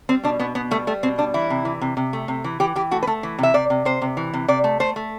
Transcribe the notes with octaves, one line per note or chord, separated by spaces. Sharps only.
G3 C4
B2 D4
B2 B3
B2 B3
G3 A3
G3 A3
B2 C4
G3 D4
E3 E4
C3
E3
C3
C3
A3
C3
E3
E3 G4
E3 G4
A3 F#4
B4
A3 A4
E3
C3 E5
C3 D5
C3
C3 C5
C3
E3
C3
C3 D5
A3
A3 C5
A3